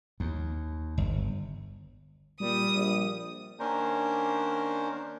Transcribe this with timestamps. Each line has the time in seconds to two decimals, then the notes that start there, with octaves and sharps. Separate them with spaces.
0.20 D#2
0.98 G1
2.40 A#2 G3 D#6
2.74 A#1
3.59 D#3 A#3 C#4 D4 A#4 C5